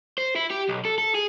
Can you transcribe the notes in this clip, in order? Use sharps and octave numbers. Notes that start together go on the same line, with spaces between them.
C5
E4
G4
B1
A4
A4
G#4